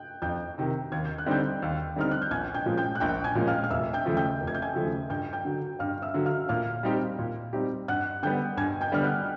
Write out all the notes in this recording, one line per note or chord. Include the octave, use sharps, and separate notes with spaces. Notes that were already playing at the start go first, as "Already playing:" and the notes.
Already playing: G5 F#6 G6
F2 G5 G6
C3 D#3
D#2 G#6
G6
F#6
D3 G3 C4 D#4 G5 G6
D#2
D3 G3 C4 D#4 F6
F#6
G6
A#1 G#5 G#6
G5 G6
A#2 F3 G#3 C#4
G5 G6
F#6
A#1 G5 G6
G#5 G#6
A#2 F3 G#3 C#4
F5 F6
F6
F1 E5 E6
G5 G6
D#2 C#3 F3 A3
G5 G6
F1
G#6
G6
G#5 G#6
D#2 C#3 F3 A3
G2 G5 G6
G5 G6
D3 F#3
G2 F5 F6
E5 E6
D3 F#3
F5 F6
A#2 F5 F6
G3 C4 D#4 G4
A#2
G3 C4 D#4 G4
G2 F#5 F#6
D3 G3 B3 G5 G6
G2 G#5 G#6
G5 G6
D3 G3 B3 F6
F#5 F#6